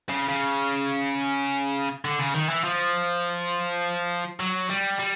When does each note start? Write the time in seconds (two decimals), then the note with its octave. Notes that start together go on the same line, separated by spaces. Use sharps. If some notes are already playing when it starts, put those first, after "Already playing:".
0.09 C#3
0.28 C#3
2.05 D3
2.19 C#3
2.34 D#3
2.49 E3
2.64 F3
4.40 F#3
4.70 G3
4.99 G3